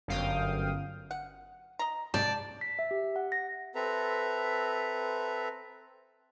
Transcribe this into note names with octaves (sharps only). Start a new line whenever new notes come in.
G1 F#2 F5 G5 D#6
F#5
D#5 A#5
G#2 C3 D5 G5 A5
B6
E5
G4
F#5
A#6
C4 A4 B4 E5 A#5